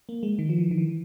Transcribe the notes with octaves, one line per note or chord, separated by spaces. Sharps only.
A#3
G#3
D#3
F3
E3
D#3
E3